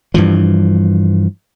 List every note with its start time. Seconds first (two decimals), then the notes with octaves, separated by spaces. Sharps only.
0.14 G2 E3 F3